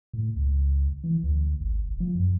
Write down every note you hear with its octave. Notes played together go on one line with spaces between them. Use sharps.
A2
C#2
E3
D2
G#1
F1
F3
F#2